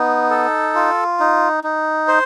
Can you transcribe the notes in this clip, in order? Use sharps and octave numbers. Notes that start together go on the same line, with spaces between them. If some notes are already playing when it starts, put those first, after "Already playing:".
Already playing: B3 D#4
A4
F4
D#4
D#4
C5